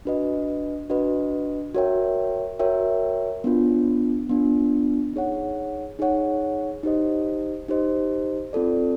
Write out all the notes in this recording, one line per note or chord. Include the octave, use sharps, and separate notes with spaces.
D4 F#4 B4 D#5
D4 F#4 B4 D#5
F#4 A#4 C#5 E5 G5
F#4 A#4 C#5 E5 G5
B3 D4 F4
B3 D4 F4
D#4 G#4 C#5 F#5
D#4 G#4 C#5 F#5
D#4 G4 C5 D#5
D#4 G4 C5 D#5
C4 F4 A4 D5